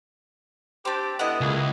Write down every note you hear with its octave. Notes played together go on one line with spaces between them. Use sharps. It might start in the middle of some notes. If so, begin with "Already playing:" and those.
C4 D4 G4
D3 B3 E4 D#5 F#5
C#2 A#3 G#4